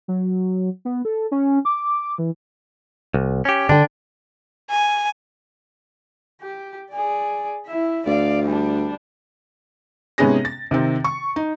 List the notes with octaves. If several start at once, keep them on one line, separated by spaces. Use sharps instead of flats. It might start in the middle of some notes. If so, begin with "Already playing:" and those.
F#3
B3
A4
C#4
D6
E3
C2
C#4 G4
D3 D4 G5
G#5
G4
G#4 D5
E4 E5
D2 D5 F5
G3 D4
G#2 C3 B3 C#4 G#4 A#6
A6
C3 D#3 C4
C#6
D#4